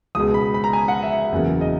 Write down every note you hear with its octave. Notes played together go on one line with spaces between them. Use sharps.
C#2 B2 G#3 D#6
B5
B5
A#5
G#5
F#5
E5
F#1 E2 C#3 F#3 A#3
D#5